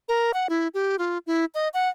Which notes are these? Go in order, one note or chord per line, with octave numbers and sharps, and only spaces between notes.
A#4
F#5
E4
G4
F4
E4
D#5
F#5